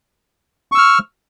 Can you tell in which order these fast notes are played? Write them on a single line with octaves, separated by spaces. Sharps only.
C#6 E6 F6